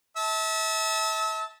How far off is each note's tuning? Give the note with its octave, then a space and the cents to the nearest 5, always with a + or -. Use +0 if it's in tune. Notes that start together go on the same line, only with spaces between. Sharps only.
E5 -35 A5 +0